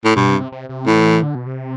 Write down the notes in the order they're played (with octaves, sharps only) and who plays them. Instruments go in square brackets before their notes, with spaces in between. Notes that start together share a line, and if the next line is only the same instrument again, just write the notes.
[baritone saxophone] A2
[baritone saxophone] G2 [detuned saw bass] B2
[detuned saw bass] C3
C3
C3
C3
[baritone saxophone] A2 [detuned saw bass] E3
[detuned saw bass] D3
B2
C3